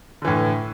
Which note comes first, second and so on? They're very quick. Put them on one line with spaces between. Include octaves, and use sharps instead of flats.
D3 E3 A2